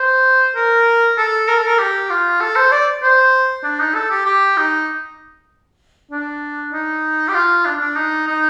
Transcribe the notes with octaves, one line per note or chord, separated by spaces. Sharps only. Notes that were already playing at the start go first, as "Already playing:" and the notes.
Already playing: C5
A#4
A4
A#4
A4
A#4
G4
F4
A4
C5
D5
C5
D4
D#4
A4
G4
G4
D#4
D4
D#4
G4
F4
D4
D4
D#4
D#4